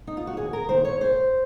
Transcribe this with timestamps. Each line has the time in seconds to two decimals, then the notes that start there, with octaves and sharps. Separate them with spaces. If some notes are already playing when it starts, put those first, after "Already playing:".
0.07 D#4
0.17 F4
0.27 F#4
0.37 D#2 G#4
0.53 A#4
0.69 D#3 A#3 C5
0.85 C#5
1.01 F#2 C5